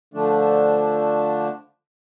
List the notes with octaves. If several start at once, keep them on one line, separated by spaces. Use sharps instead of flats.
D3 F3 A3 D4